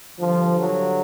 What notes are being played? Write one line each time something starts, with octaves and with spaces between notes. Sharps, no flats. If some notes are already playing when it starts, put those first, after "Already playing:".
G2 D3 F3
F#3